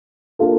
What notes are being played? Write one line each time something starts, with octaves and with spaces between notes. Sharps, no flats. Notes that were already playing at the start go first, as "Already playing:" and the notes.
A#3 D4 F4 A4